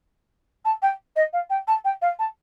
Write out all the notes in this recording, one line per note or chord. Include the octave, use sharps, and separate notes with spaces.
A5
G5
D#5
F5
G5
A5
G5
F5
A5